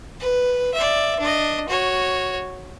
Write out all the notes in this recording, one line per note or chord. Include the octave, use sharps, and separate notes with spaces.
B4
D5 E5
D4 D#5
F#4 C#5